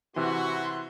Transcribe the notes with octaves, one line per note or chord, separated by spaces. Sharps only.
C3 E3 E4 F#4 C6